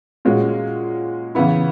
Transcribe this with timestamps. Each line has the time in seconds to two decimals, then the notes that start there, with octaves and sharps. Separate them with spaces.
0.25 A#2 G#3 C#4 F#4
1.35 C#3 E3 B3 E4